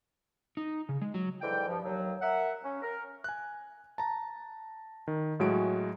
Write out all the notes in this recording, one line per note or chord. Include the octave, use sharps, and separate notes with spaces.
D#4
C#3
G#3
F#3
G#2 D3 E3 G5
G2 F3
D#2 F#3
A#4 E5 F#5
C#4
A#4
G#5 F#6
A5 A#5
D#3
A2 F#3 G#3 F#4 G#5 D7